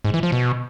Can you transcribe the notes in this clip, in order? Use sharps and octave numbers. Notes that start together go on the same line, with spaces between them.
G#2
E3
F3
B2